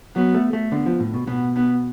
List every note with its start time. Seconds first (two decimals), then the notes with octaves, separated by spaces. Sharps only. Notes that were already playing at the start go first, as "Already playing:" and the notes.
0.16 F#3 B3
0.35 A3
0.53 A3
0.71 D3 B3
0.86 F3
1.00 A2
1.14 B2
1.28 B2 B3
1.56 B3